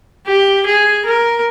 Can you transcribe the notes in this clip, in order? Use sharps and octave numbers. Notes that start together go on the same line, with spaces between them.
G4
G#4
A#4